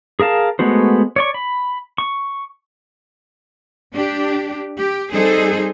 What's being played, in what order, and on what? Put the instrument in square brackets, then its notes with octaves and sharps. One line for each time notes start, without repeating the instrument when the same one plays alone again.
[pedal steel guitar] G#4 A#4 F5 A5
G#3 A3 B3 F#4 C5
C#5 D5 C#6
B5
C#6
[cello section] D4 G4
G4
G3 C4 D#4 G#4 A4 C5